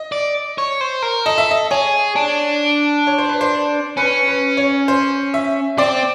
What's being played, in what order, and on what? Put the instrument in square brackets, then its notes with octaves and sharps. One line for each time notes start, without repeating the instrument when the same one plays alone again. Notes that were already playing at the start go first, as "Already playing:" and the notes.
Already playing: [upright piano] D#5
[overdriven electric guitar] D5
C#5
C5
A#4
[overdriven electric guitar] A4 [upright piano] D#5
[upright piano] E5
D#5
[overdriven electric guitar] G#4 [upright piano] C#5
[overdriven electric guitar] D4
[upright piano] C#5
C5
B4
C5
[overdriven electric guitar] C#4 [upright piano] B4
[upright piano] B4
C#5
C5
E5
[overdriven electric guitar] C4 [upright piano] D5